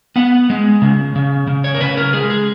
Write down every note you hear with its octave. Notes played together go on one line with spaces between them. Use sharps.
B3 F#5
G#3
C#3
C#3
C#3
C#5
A#4
C#3 B4
A#4
G#3 G#4
G#4